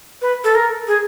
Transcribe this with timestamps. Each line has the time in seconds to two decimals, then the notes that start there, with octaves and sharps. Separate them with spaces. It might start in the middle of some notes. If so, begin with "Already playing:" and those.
0.22 B4
0.44 A4
0.55 A#4
0.88 G#4